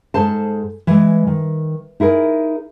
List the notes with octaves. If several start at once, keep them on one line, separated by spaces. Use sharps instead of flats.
G#2 G#4 A4 C5 A5
E3 G#3
D#3
D#4 E4 G#4 A#4